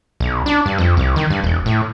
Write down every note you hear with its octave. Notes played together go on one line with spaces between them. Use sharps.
B1
D4
G2
F2
C2
D#3
G2
E1
A2